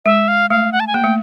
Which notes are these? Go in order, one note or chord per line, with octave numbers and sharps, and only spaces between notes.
G#3 E5
F5
A3 F5
F#5
A5
G#5
A#3 G5
A3